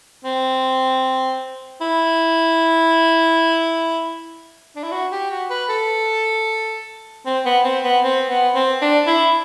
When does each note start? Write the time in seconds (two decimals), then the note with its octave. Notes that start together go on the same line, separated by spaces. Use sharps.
0.25 C4
1.81 E4
4.76 D4
4.84 E4
4.92 F#4
5.12 G4
5.31 F#4
5.50 B4
5.70 A4
7.26 C4
7.45 B3
7.64 C4
7.84 B3
8.04 C4
8.29 B3
8.55 C4
8.82 D4
9.07 E4